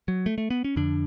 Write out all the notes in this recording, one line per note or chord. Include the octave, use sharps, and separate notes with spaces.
F#3
A3
A3
B3
C#4
F2 D3 D4